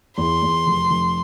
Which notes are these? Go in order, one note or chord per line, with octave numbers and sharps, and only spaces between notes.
E2 C6
E2
F1
F1